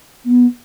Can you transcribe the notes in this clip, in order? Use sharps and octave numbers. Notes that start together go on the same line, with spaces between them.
B3